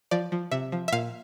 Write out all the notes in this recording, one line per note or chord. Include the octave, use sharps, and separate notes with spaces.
F3 D5
F3
C3 E5
F3
E5
A#2 F5